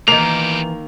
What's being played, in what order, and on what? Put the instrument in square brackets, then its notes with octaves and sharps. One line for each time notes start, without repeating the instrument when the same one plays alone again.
[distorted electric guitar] B2 G4 [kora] D#3 A#3 [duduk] E3 [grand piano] F7